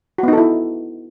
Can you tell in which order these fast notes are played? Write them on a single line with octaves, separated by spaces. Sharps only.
F#4 B3 D#4 A4 E4